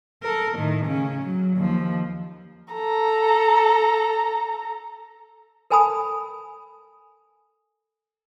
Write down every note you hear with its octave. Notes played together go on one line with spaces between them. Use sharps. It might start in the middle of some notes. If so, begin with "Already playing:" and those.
A4 A#4
A2 D#3
C#3 C#4
F#3
D#2 F3
A4 A#5
A4 A#4 G#5 A5 B5 D#6